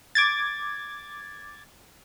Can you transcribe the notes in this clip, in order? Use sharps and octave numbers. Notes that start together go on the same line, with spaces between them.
D6 G#6 A6